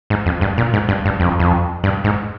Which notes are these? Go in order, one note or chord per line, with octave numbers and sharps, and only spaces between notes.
G#2
F2
G2
A#2
G#2
G2
G2
F2
F2
G2
G#2